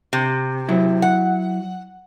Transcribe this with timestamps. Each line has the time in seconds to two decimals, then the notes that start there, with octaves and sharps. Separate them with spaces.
0.13 C3
0.69 F#3 E4
1.02 F#5